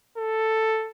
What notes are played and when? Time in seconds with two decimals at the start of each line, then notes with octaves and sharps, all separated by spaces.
0.17 A4